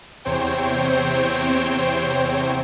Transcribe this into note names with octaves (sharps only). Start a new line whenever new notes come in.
E2 C3 C4 C5 C#5 G5